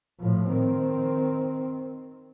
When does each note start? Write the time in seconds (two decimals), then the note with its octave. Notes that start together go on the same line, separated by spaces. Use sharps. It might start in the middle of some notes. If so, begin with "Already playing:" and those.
0.20 A2 F3
0.50 D#3 C4